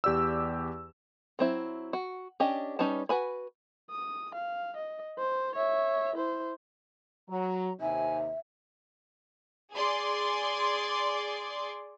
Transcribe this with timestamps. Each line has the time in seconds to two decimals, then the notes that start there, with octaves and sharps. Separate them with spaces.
0.04 E2 G4 D5 E6
1.39 F#3 C4 E4
1.93 F#4
2.40 C#4 D4 G4 D#5
2.79 G3 C#4 D#4 B4 A5
3.09 F#4 B4 G#5 B5
3.91 D#6
4.35 F5
4.77 D#5
5.19 C5
5.55 C#5 E5
6.16 E4 C5
7.29 F#3 A#5
7.81 D#2 C3 D#4 E5 G#5
9.74 G#4 D5 C6